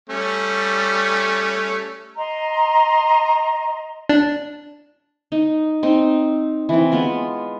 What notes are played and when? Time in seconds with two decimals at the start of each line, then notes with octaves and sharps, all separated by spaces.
0.09 G3 A3 C#4
2.17 D#5 A#5 C6
4.09 D4
5.32 D#4
5.83 C4 D#4
6.69 E3 C4
6.91 G#3 B3 F4